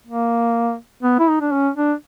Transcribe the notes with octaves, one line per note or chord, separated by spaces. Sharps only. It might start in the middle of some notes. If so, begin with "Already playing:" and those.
A#3
B3
E4
D#4
D4
C#4
D4